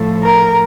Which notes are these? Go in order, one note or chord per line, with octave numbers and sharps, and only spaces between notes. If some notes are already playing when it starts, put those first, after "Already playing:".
Already playing: A2 F3 A3
A#4